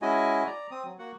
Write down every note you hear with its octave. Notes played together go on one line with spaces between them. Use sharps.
G#3 C#4 E4 F#4 D#5 G#5
D5 A#5
C4 D#6
F#3
A#3 F#4 F#5